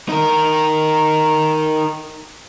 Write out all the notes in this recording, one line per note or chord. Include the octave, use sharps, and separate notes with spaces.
D#4 A#4